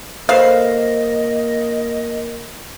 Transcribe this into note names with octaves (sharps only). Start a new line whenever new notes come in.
A#3 A4 B4 C5 D#5 F5